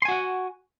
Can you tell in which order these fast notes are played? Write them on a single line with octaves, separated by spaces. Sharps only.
C6 G#5 F#4 F#5